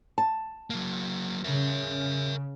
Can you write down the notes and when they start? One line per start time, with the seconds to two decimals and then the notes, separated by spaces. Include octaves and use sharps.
0.18 A5
0.70 F#3 A#3
1.44 C#3 A#4 E5